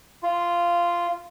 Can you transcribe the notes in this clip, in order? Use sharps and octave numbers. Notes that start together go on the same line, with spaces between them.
F4